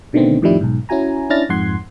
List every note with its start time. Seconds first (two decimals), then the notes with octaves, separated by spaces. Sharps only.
0.13 B2 D3 D#3 A3 B3 C4
0.42 F2 A2 D#3 F3 G3 E4
0.61 B1 G#2
0.89 C#4 E4 F#4 G#5 A#5
1.30 C#4 D4 E4 F6 A6 A#6
1.49 F2 G#2 F#5 C6 G#6